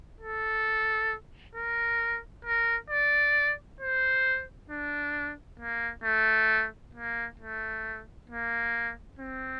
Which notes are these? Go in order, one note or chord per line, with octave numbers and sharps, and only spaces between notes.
A4
A#4
A#4
D5
C5
D4
A#3
A3
A#3
A3
A#3
C4